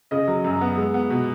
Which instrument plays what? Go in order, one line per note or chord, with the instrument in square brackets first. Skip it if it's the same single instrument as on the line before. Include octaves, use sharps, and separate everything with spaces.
[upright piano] C#3 D#5
F#3
F#2
B3
G#3
B3
B2